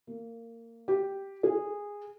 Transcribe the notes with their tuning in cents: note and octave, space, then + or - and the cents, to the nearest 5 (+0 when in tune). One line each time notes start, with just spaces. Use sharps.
A#3 -20
G4 +0
G#4 -15